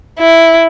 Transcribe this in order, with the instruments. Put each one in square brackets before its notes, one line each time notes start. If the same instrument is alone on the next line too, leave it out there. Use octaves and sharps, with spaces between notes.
[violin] E4